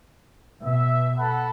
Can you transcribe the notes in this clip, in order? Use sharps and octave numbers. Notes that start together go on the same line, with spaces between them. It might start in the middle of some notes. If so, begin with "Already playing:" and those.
B2 E5
A4 F#5 B5